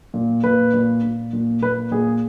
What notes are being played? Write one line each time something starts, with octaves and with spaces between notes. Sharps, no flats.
A#2
A#2 B4
A#2
A#2
A#2
A#2 B4
A#2 G#4